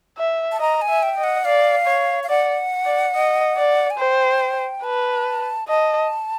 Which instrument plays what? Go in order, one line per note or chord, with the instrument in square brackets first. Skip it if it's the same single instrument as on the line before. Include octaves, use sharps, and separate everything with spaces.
[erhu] E5
[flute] A5
[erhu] D#5 [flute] A#5
[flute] G#5
[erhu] E5
[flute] G5
[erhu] D#5
[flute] F#5
[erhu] D5 [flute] F5
[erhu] C#5
[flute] F5
[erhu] D5 [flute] F#5
[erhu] D5
D#5
D5
[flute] G#5
[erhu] C5 [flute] G5
[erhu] B4 [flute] A5
[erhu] D#5 [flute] A5